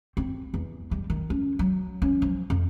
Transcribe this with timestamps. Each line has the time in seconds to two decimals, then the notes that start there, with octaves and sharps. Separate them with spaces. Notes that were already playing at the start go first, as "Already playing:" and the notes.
0.17 C4
0.54 E2
0.91 G3
1.10 D#3
1.30 C#4
1.59 F#3
2.02 C#4
2.22 F3
2.50 F2